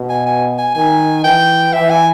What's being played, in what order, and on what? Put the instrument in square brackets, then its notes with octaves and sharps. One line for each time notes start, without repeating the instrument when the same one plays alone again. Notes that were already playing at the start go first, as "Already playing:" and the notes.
Already playing: [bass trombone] B2
[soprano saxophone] G#5
G#5
G#5
[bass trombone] D#3 [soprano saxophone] G#5
[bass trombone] E3 [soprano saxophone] G5
[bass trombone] E3 [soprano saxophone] E5
[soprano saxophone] G#5